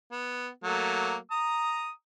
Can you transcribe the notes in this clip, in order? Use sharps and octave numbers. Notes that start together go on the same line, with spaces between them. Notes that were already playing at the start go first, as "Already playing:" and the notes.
B3
F#3 A3 A#3
A#5 D#6